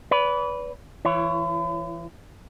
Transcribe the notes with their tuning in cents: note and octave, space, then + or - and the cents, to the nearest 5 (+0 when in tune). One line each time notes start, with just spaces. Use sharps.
B4 +0 D5 -40
E3 +15 E4 +45 C#5 +0